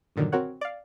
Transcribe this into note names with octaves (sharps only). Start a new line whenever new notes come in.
G2 A#2 D3 D#3 F#3
C4 F#4 A#4 C#5 F#5
D5 F5